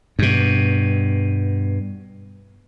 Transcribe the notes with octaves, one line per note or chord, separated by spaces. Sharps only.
G2 B2